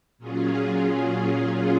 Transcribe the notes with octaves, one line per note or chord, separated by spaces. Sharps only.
A#2 F#3 C#4 F4 G#4